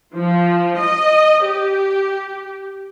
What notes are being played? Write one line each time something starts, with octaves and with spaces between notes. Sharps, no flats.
F3
D#5
G4